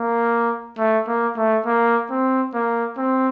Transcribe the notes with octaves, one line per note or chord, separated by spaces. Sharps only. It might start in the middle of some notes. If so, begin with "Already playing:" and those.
Already playing: A#3
A3
A#3
A3
A#3
C4
A#3
C4